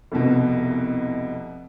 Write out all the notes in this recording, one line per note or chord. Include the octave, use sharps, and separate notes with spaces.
F1 C2 B2